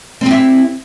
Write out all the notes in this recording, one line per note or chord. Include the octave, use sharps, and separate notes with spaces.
C4 E4 G4